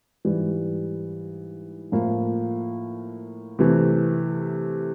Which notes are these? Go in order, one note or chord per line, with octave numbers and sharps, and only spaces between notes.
G#2 E3 G3
A2 F3 A#3
C3 E3 A3